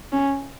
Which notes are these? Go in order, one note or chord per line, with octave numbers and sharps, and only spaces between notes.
C#4